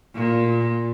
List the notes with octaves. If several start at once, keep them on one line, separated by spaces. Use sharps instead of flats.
A#2